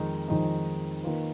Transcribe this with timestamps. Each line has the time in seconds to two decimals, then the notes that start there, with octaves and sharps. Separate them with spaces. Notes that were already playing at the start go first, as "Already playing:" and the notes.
Already playing: F2 D#3 G#3 D#4
0.28 F2 D#3 G#3 D#4
1.02 D#3 A#3 F4 B4